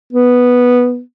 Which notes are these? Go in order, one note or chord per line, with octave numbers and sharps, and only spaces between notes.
B3